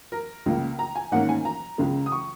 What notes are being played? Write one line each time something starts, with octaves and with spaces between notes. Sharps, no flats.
A#4
C#2 C#3 A#3
A#5
G#5
G#2 D#3 A#3 C#4 F#5
G#5
A#5
C#2 C#3 G#3
D#6
C#6